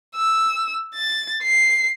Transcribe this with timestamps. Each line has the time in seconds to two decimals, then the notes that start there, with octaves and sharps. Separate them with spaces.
0.16 E6
0.95 A6
1.43 C7